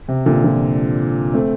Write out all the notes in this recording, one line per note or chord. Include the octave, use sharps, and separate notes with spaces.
C3
A#2 D3
D3 F3
A3 C4